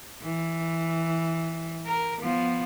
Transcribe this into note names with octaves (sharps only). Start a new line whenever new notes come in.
E3
A#4
F3 B3